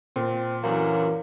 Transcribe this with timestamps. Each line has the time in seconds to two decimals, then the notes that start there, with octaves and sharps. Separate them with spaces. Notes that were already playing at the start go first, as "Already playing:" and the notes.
0.16 A#2 C4
0.63 F#2 D3 E3 F#3 A#3